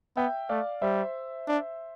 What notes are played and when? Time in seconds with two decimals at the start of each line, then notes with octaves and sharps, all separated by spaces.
0.17 B3 E5 G5
0.49 A3 D5 F5
0.82 G3 C5 E5
1.48 D4